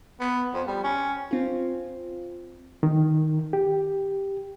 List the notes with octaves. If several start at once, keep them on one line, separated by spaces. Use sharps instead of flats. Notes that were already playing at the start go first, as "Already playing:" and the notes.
B3
F2
G3
C#4
C4 F4
D#3
G4